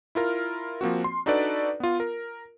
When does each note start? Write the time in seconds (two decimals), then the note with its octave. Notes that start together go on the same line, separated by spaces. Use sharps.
0.15 E4 F4 A#4 F6
0.81 F3 A#3 C4 F#4
1.04 C6
1.26 D4 D#4 F#4 A4 B4 D5
1.80 B3 F4
2.00 A#4